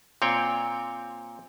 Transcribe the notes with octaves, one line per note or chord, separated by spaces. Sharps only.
A#2 C4 C#5 G5